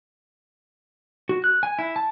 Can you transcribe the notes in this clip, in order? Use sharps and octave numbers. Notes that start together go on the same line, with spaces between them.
F#4
F#6
G#5
E4
A5